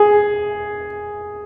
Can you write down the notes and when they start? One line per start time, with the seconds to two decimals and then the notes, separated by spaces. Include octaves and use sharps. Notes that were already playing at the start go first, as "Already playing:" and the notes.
Already playing: G#4